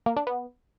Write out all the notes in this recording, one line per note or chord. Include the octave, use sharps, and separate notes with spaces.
A#3
D4
B3